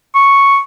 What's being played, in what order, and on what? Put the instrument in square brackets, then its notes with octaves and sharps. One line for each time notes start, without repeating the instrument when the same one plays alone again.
[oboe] C#6